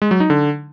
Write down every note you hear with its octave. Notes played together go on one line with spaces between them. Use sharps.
G#3
F#3
D#4
D3